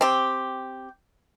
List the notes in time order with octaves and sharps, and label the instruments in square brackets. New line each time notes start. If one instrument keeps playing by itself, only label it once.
[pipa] C4 G4